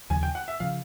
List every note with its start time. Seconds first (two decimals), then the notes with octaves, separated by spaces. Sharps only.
0.10 F1 D#2 C#3 F3 G#5
0.23 G5
0.35 F#5
0.48 E5
0.60 C#3 F3 F5